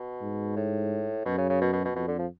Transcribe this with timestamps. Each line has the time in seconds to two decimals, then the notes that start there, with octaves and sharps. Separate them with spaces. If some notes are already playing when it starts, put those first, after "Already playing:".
Already playing: B2
0.22 G#2
0.56 A2
1.25 F#2 B2
1.38 C#3
1.49 C#3
1.61 B2
1.73 B2
1.85 B2
1.95 F2 B2
2.08 D3
2.19 F3